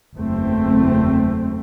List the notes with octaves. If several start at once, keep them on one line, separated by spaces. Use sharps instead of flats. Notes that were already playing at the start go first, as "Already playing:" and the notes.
F#1 E2 A3 C4